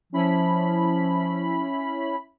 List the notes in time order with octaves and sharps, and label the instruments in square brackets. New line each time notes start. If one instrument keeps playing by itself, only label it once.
[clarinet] F3 [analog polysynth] C#4 E4 B5